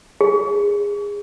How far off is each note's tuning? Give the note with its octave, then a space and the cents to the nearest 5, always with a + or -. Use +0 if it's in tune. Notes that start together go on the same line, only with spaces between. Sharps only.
G#4 -25